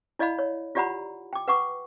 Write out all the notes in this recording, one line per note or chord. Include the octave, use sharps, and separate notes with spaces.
E4 D5 D#5 F5 B5
C#5
F4 G4 D5 F#5 A#5 B5
G5 D6
B4 F#5 C#6 D6